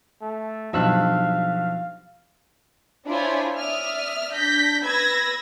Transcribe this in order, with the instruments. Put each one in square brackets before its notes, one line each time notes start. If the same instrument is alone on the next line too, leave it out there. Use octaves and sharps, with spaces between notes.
[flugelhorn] A3
[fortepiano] B1 G2 [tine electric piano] F3 E6 F#6 [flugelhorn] F5
[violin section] D4 E4 F4 C5 C#5 G#5
D5 E5 D#6 F6
D4 G6 A#6 B6
B4 B5 E6 G#6 A#6